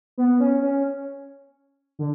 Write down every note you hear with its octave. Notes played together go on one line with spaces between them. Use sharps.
B3
C#4
C#4
D3